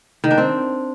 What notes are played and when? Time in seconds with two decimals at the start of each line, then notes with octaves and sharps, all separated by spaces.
0.24 D#3
0.31 D4
0.38 C4